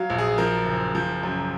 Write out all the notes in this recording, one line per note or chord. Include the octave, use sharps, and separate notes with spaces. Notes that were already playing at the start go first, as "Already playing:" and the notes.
Already playing: F#3 F5
A#1
G#4
F3 A#4
F#1
F3
F#2